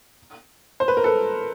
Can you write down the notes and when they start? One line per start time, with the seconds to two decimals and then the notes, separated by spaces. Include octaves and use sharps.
0.80 C5
0.88 B4
0.97 A#4
1.04 A4 B4